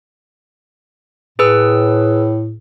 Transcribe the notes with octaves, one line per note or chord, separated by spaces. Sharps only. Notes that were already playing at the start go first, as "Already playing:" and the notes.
A2 G#4 B4 E6